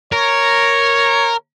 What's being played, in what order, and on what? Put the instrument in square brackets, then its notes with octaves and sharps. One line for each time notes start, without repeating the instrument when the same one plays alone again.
[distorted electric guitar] A#4 [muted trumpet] C#5